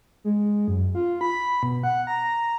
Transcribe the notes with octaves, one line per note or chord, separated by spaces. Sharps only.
G#3
F#2
F4
B5
B2
F#5
A#5